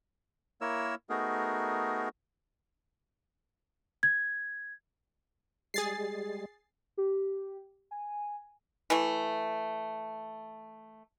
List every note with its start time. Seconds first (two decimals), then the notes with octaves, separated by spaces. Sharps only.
0.61 A#3 E4 A#4 C#5 E6
1.09 A3 B3 D#4 F#4 G#4 A#4
4.03 G#6
5.74 G3 G#3 G#4 A6 C7
6.97 G4
7.91 G#5
8.90 E3 A3